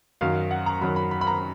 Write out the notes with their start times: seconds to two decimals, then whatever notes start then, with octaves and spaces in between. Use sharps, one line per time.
0.21 F#2 D#3 F#3 F5
0.36 F5
0.51 F#5
0.66 A#5
0.81 F#2 D#3 F#3 B5
0.96 B5
1.11 B5
1.21 B5
1.27 A#5